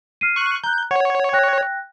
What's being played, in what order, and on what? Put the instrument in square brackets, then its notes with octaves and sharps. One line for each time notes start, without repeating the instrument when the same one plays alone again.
[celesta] F6 C7 D#7
[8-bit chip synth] C#6 F#6
[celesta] A#5 F#6 [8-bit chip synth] G6
[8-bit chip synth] C#5 [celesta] F#5
[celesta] G5 F#6 A#6